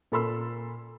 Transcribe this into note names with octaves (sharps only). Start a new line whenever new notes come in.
A#2 A4 B5 C6 E6